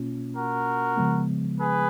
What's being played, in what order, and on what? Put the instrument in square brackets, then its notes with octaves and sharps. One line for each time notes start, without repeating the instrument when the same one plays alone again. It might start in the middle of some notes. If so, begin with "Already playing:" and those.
Already playing: [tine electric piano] B2 A#3 C#4 F4
[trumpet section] F#4 A#4
[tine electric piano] C#3 F3 G#3 B3
[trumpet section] G#4 B4